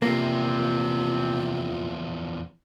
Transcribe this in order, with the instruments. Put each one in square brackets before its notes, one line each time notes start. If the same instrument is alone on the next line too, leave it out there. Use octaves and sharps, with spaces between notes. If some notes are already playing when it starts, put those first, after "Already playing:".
[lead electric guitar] E2 F3 [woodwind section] C3 C4 [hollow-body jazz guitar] A#3 [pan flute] F4